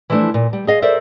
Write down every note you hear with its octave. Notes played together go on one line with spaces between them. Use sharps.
E3 F3 G3 A3 D4 E4
A#2
G3
G#4 D#5 F5
A4 A#4 C5 D5 E5